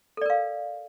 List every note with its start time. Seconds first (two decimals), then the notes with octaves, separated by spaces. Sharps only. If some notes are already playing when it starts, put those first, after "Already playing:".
0.17 A4
0.21 D5
0.26 A#4
0.30 F5